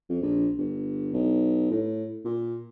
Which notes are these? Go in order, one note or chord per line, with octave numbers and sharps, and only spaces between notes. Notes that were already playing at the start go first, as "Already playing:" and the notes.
F2
A#1
G1
B1
A2
A#2